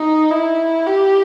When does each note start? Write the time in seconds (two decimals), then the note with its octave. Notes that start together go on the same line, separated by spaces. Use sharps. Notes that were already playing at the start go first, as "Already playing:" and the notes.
Already playing: D#4
0.31 E4
0.87 G4